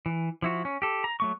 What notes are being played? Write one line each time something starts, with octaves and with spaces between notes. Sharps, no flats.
E3
F3 E4 F#4
C#4
G4 A4
A#5
F#3 A3 C#6